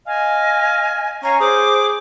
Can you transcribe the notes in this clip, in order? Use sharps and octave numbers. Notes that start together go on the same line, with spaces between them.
D#5 F5 G#5
C#4 C#5 F5 A#5 C#6
G#4 C5 D6